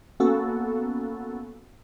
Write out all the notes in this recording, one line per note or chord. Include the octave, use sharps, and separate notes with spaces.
A#3 B3 C#4 F#4 A4